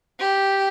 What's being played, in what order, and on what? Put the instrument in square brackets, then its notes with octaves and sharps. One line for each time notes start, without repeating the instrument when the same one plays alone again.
[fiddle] G4